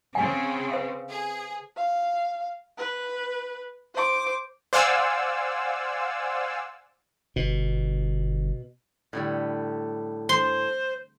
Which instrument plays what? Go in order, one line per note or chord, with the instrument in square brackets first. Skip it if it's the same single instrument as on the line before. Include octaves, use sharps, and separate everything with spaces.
[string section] C#3 C4 [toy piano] F#5 G#5
[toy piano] B4 C5 F5
[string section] G#4
[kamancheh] F5
B4
C5 D6
[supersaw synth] C5 D5 F5 F#5 G#5 E6
[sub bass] G1 [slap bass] B2
[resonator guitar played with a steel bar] A2 D3 G3
[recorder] C5 [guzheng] C6